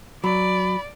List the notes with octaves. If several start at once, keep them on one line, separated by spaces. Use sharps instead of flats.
F#3 D5 B5